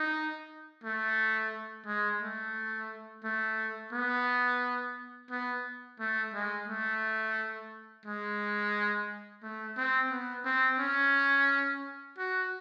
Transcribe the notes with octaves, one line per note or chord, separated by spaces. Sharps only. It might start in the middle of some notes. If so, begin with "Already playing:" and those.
Already playing: D#4
A3
G#3
A3
A3
B3
B3
A3
G#3
A3
G#3
A3
C4
B3
C4
C#4
F#4